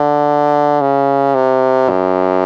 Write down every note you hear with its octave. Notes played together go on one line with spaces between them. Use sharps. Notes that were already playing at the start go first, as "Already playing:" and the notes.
Already playing: D3
C#3
C3
F#2